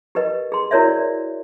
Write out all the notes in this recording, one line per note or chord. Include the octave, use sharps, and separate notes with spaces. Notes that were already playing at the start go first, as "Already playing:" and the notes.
G4 A#4 B4 D#5
G#4 C6
E4 F#4 A#4 C#5 D5 E5
D5